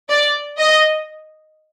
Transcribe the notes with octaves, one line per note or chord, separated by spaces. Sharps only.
D5
D#5